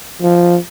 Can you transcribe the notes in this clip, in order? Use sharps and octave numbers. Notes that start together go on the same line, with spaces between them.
F3